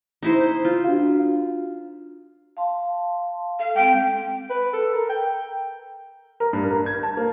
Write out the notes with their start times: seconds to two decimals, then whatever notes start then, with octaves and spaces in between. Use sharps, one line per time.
0.23 D#4 E4 C5
0.65 F4
0.84 D4 F#4 F5
2.57 F5 A5 C6
3.60 A4 F5
3.75 G#3 C4 G5
4.50 B4
4.74 A4
4.94 A#4
5.10 G5
6.40 A#4
6.53 G2
6.71 A#4
6.86 G#6
7.03 A5
7.17 A#3